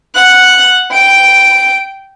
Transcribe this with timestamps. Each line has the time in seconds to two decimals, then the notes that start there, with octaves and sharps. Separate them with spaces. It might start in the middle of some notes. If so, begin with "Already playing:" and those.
0.15 F#5 F#6
0.92 G5 D7